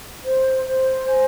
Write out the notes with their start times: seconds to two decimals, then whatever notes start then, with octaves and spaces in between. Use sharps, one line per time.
0.23 C5
0.64 C5
1.05 G#5